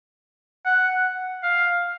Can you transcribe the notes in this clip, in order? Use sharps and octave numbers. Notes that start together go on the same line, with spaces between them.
F#5
F5